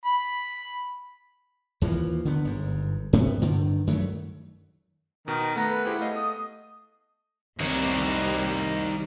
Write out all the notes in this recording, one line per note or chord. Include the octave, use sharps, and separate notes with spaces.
B5
D#2 E3 F3
D3 D#3 B3
G1 G#2
G#2 C3 B3
G2 D3 D#3
F#2 D#3 F#3 A3
B2 D#3
A3 B3 A#5
B4
E4 G4 G#4 C5
A3 D#5 F5
D#6
C2 D#3 G3 D#4 C#5